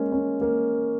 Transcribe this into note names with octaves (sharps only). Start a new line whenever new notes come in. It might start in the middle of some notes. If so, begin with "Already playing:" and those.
Already playing: G#3 A#3 C#4
C#4
A#3